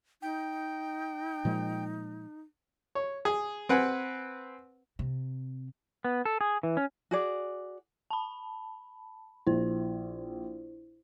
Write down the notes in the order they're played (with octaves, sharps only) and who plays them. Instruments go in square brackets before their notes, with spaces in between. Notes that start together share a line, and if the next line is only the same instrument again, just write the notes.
[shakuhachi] D#4 [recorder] G5
[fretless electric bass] A#2 F3 G#3
[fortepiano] C#5
G#4
C4 B4 F#5 G#5
[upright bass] C3
[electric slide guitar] B3
A4
G#4
E3
C#4
[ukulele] F#4 G#4 D5
[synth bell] A5 B5
[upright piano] A#1 [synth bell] E4 C5